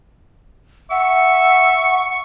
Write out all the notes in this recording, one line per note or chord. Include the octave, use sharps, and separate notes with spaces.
E5 F#5 C#6